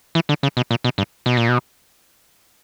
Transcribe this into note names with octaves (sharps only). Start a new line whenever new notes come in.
E3
D3
C#3
B2
A#2
B2
G2
B2
A#2
B2